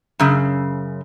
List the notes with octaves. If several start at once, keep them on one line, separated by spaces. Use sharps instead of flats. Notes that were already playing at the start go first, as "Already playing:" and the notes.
F#2 C#3